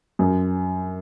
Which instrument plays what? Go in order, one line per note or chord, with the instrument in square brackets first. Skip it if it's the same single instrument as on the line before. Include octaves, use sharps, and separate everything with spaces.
[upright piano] F#2